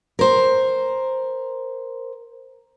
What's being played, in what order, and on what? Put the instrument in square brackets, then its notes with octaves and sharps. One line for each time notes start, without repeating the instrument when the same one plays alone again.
[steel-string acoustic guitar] A#4 C5